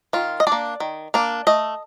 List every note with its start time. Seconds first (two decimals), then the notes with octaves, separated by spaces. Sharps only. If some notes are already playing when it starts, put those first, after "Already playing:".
0.13 D#3 F4
0.40 D#5
0.47 D4 D5
0.52 A#3
0.80 D#3
1.14 A#3 D4
1.47 A3 D#5